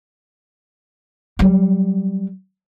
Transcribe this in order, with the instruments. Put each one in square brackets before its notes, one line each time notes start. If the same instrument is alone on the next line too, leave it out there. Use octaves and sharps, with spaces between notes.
[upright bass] F#3 G3